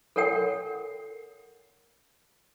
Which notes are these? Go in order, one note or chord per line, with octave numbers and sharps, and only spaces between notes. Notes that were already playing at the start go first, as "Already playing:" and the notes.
A4 A#4 C#5 F#5 G5